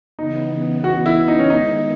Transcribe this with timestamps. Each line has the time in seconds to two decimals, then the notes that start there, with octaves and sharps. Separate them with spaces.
0.18 C#3 E3 B3 D#4
0.84 F#4
1.06 E4
1.28 D#4
1.39 C#4
1.50 D#3 G#3 B3 D#4 E4